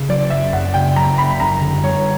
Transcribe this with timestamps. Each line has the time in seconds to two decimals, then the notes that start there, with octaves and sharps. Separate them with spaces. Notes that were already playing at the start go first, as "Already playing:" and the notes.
Already playing: C#3
0.09 F#3 D5
0.30 F#1 E5
0.53 F#2 F#5
0.74 C#3 G5
0.96 F#3 A#5
1.18 F#1 B5
1.40 F#2 A#5
1.61 D3
1.83 G3 C#5